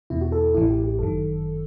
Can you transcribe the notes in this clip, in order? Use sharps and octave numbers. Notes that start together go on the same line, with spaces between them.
E2 B2 E4
F#4
A4
A1 A2 E3 E4
G4
G4
G1 F#2 D#3 A4